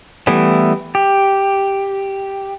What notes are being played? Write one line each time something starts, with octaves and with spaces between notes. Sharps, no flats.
E3 G3 A3 B3 E4
G4